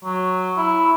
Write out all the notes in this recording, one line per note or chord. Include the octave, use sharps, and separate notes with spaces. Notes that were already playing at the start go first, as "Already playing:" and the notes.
F#3
E4